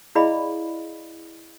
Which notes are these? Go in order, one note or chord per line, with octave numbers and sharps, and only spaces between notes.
E4 G#4 D5 D#5 F5 B5